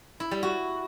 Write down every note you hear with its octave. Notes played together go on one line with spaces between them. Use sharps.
E4
G3
F#4